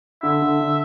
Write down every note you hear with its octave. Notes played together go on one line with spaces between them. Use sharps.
D3 E5
D3
D3